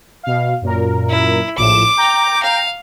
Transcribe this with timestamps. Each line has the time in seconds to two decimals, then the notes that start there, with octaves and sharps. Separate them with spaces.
0.23 B2 F5
0.62 F#2 A#2 A#4
1.09 E4
1.57 A#1 A2 D6 E7
1.97 G5 A#5
2.43 F5